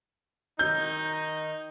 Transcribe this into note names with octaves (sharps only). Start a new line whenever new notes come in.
D#3 D#4 G6